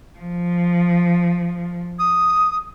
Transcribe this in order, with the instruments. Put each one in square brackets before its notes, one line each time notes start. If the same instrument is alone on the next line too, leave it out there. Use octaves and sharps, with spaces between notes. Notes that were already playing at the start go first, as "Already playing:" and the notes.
[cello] F3
[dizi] D#6